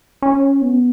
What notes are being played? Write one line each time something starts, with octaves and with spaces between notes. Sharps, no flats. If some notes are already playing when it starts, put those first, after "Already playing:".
C#4
B3